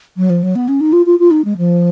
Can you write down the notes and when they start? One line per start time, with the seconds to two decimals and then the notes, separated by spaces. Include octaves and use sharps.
0.17 F#3
0.30 F3
0.43 F#3
0.55 B3
0.68 C#4
0.81 D#4
0.93 F4
1.06 F4
1.19 F4
1.31 D#4
1.45 G#3
1.58 F3